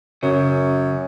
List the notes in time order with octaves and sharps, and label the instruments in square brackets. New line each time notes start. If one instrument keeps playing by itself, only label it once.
[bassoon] F#2 [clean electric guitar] C#3